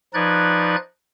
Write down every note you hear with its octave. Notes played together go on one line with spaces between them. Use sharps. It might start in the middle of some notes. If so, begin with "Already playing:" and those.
F3 D#4 B4 D5 F#6 G#6